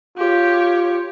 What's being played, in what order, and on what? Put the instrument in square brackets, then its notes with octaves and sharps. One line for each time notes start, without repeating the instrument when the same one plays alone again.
[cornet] F4 [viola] G4 C#5